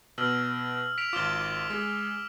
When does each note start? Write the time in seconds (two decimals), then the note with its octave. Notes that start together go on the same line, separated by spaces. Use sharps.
0.18 B2 E6 F6 F#7
0.98 B6 D7 F7
1.13 G#1 F4 D6 F6 G7
1.70 G#3 G#4